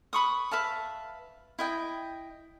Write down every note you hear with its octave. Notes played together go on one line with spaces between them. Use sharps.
B4 B5 C#6 D#6
B4 E5 F5 A5
E4 D#5 G5